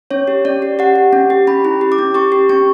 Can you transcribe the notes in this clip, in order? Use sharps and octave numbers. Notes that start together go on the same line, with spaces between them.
C#4 C#5
G4
C#4 D5
G4
G4 F#5
G4
C#4
G4
C#4 B5
E4
G4
D6
C#4
G4 C#6
G4
C#4 C#6